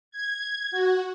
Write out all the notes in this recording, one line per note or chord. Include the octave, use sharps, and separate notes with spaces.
G#6
F#4